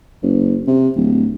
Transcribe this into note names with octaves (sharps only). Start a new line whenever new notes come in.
F#1
C3
D1